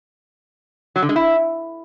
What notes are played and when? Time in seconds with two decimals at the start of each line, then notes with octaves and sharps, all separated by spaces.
0.96 F#3
1.02 D3
1.09 G#3
1.16 E4